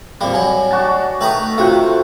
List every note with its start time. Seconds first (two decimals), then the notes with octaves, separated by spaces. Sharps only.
0.21 F2 G3 A#3
0.34 F#3 G#5
0.71 D4 F#4 A5
1.21 D#3 A3 B4 A#5 D#6
1.58 C3 A3 F4 F#4 C5 F5 F#5